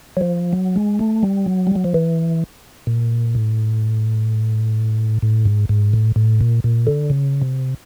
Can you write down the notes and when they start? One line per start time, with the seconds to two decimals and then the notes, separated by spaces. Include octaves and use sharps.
0.17 F#3
0.21 F3
0.53 F#3
0.76 G#3
0.99 A3
1.23 G3
1.46 F#3
1.67 G3
1.75 F#3
1.84 F3
1.94 E3
2.87 A#2
3.35 A2
5.22 A2
5.45 G#2
5.69 G#2
5.93 A2
6.16 A2
6.41 A#2
6.64 A#2
6.87 D3
7.10 C#3
7.42 C3